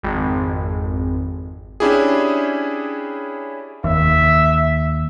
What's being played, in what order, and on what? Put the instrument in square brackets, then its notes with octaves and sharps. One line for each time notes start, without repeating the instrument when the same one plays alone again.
[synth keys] G#1 F2
[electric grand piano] C#4 D4 E4 G4 G#4
[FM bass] F1 [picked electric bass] D#2 [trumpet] E5